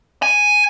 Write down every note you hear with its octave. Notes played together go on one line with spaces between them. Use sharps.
G#5